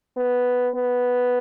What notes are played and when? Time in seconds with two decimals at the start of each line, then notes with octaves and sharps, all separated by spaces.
0.17 B3
0.75 B3